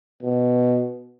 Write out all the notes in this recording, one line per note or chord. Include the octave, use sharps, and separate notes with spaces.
B2